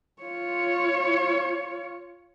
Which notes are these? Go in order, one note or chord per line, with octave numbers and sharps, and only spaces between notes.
F4 C#5